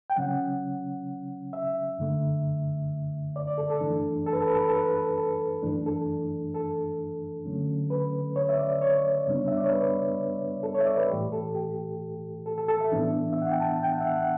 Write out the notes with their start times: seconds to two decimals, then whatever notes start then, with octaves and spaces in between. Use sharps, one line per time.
0.10 G5
0.16 C#3 F#3 C#4 F#5
1.53 E5
1.99 F#2 D3 A3
3.36 D5
3.47 D5
3.58 A4
3.70 A4
3.81 F#2 E3 A3 D4
4.26 A4
4.33 B4
4.41 A4
4.47 B4
4.55 A4
4.62 B4
4.69 A4
4.76 B4
4.83 A4
4.90 B4
4.97 A4
5.17 A4
5.63 F#2 E3 A3 D4
5.86 A4
6.54 A4
7.45 D3 F#3 A3 C#4
7.90 B4
8.36 C#5
8.49 E5
8.58 D5
8.81 C#5
9.27 F#2 C#3 G3 B3 D4
9.48 E5
9.57 D5
9.64 C#5
9.73 B4
10.63 A4
10.75 C#5
10.80 E5
10.86 D5
10.97 B4
11.10 A2 E3 A3 G4
11.32 A4
11.55 G4
12.46 A4
12.58 A4
12.68 A4
12.81 E5
12.92 A2 E3 B3 D4
13.33 E5
13.42 F#5
13.51 G5
13.60 A5
13.83 G5
13.92 F#5
14.01 E5
14.11 F#5